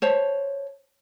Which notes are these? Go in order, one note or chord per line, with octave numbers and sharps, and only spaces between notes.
C5 C#5 A5